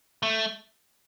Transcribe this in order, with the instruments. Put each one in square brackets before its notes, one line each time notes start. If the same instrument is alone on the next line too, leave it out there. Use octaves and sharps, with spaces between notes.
[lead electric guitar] A3